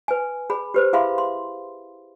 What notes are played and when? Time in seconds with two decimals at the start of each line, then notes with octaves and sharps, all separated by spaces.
0.08 B4 G#5
0.50 G#4 B5
0.74 G4 B4 C5
0.93 E4 G#4 E5 F5 B5 C6
1.18 C6